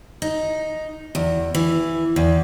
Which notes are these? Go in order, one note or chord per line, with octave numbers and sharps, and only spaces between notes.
D#4
E2
E3
E2